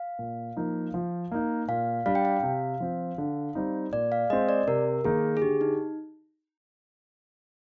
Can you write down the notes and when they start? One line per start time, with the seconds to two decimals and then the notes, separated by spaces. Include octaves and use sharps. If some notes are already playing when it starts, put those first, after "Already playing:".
Already playing: F5
0.19 A#2
0.57 F3 A#3 D#4
0.94 F3
1.32 A#3 D#4
1.68 A#2 F5
2.06 G3 D4 F5
2.15 G5
2.25 F5
2.43 C3
2.80 F3 C4
3.18 D3
3.55 G3 C4 D#4
3.93 A#2 D5
4.12 F5
4.30 G#3 C4 D#5
4.49 D5
4.68 C3 A#4
5.04 D#3 A#3 D#4 G#4
5.37 G#4
5.42 D3 G4
5.61 D#4